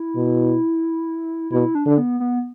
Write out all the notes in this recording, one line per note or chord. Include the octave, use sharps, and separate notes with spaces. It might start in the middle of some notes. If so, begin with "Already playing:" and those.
Already playing: E4
B2
B2 E4
D4
D3 D4
B3
B3